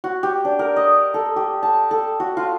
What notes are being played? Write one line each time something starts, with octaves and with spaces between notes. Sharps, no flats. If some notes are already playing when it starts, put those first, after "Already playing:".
F#4
G4
D4
A#4
D#5
A4
G4
A5
A4
F#4
F4